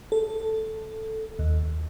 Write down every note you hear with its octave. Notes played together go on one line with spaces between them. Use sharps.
A4
D#2